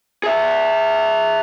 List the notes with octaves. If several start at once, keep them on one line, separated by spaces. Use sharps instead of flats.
G#4 E5